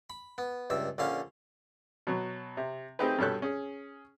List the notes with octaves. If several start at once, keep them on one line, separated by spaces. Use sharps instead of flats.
B5
B3
C#2 G2 E5
A#1 D3 C#4 F5
B2 F#3
C3
A3 C4 D#4 G4 G#4 B4
G2 B2 G4 A4 C#5 F#6
C#4 G#4